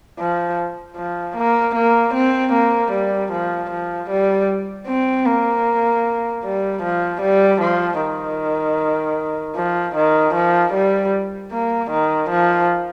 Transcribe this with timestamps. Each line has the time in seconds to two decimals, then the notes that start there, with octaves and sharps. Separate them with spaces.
0.19 F3
0.96 F3
1.36 A#3
1.75 A#3
2.14 C4
2.53 A#3
2.92 G3
3.32 F3
3.70 F3
4.10 G3
4.88 C4
5.26 A#3
6.44 G3
6.83 F3
7.22 G3
7.61 F3
8.00 D#3
9.56 F3
9.95 D#3
10.34 F3
10.73 G3
11.51 A#3
11.91 D#3
12.30 F3